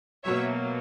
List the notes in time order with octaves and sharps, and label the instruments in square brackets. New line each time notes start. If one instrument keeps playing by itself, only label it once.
[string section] B2 F#3 A#3 C#5 E5